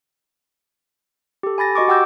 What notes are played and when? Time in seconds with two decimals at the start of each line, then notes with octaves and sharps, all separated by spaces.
1.43 G4 A4
1.58 G#5 B5 A6 A#6
1.75 F#4 D#5 C#6 D6
1.88 G4 F#5 G5 D6 E6 G6